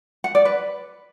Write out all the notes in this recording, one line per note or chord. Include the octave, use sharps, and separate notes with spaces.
F#5
D5
B4